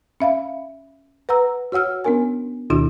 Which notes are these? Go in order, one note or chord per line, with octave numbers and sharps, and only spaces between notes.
C#4 E5 F5 B5
B4 F#5 A#5 E6
F#4 C#5 F#5 E6 F6
B3 C#4 D4 A#4 G#5
D2 B2 D#3 D4 E4 F#4